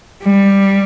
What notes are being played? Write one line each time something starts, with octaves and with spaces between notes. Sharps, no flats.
G3